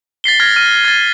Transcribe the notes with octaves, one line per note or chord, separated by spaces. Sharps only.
A6 B6 C7 G7
F6 G#6 A#6
F6 D#7
G#6 A6